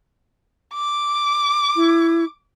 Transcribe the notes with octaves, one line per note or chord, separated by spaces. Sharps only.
D6
E4